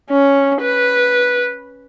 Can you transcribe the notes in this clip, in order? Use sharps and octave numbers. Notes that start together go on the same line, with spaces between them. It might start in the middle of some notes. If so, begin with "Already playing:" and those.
C#4
B4